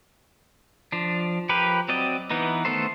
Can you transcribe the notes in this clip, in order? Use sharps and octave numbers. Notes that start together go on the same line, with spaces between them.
F3 D4
F3 G4 A#4 B4
F#3 C4 D5 D#5
E3 B3 D#4
D#3 A3 B3 A4 C5